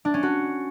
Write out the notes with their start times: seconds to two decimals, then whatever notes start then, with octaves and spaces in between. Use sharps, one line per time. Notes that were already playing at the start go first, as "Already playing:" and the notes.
0.05 D4
0.14 C#4
0.23 F#4